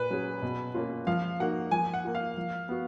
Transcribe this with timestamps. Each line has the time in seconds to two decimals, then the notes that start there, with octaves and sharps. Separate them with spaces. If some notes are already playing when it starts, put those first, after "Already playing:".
Already playing: A#2 B4
0.10 F#3 C#4 G#4
0.42 B2
0.74 A#3 C#4 F4
1.07 F3 F5
1.40 A#3 D#4 F#4 A#4 F#5
1.71 F3 G#5
1.93 F#5
2.04 A#3 F4
2.15 F5
2.37 F3
2.69 B3 F#4